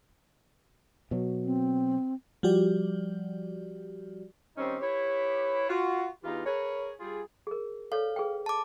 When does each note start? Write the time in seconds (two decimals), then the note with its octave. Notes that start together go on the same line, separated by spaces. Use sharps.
1.11 B2 F#3
1.45 C4
2.43 F3 G3 F#4 G4 D5
4.57 D#3 G3 C4 C#4 D#4
4.81 E4 G4 B4 C#5
5.68 F4 F#4
6.24 E2 E3 D#4 F4 G4
6.46 G#4 A#4 B4 C#5
7.00 G3 F4 G#4
7.47 G#4 A#4
7.92 A4 C#5 D5 F5
8.16 G#4 B4 G5
8.46 A5 D6